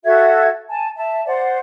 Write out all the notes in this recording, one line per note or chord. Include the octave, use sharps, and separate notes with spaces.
F#4 A4 E5 G#6
G#5 A5
E5 A5
C5 D5 F#5